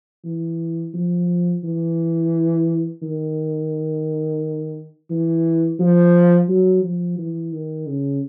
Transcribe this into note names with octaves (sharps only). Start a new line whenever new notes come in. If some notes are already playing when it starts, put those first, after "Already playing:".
E3
F3
E3
D#3
E3
F3
F#3
F3
E3
D#3
C#3